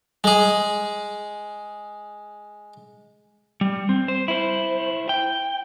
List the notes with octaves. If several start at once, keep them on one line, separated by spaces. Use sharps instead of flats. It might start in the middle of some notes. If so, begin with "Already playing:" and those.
G#3 G#4
G3
C4
C5
E4 C5
G5